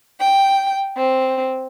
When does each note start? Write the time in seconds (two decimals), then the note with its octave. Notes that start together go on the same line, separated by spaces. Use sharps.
0.20 G5
0.96 C4